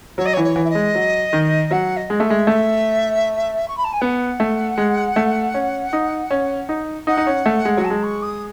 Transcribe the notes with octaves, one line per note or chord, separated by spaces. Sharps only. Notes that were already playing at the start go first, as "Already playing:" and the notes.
F#3 C#5
D#5
C#5
E3
C#5
E3
E5
D#5
G#3
F#3
D#3
F#3 F#5
D#5
G#3
A3 E5
G#3
A3
C#6
B5
A5
G#5
B3 F#5
A3
G#3
A3
C#4
D#4
C#4
D#4
D#4 F#5
D#4
C#4
A3
G#3
F#3
A5
G#3
C#6
D#6